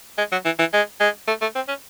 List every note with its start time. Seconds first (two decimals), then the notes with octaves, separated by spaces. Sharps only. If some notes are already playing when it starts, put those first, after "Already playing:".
0.18 G#3
0.32 F#3
0.45 E3
0.59 E3
0.73 G#3
1.00 G#3
1.28 A3
1.42 A3
1.55 C4
1.68 C#4